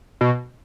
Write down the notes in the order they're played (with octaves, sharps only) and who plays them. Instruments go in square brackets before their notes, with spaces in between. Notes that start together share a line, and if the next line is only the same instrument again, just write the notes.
[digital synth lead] B2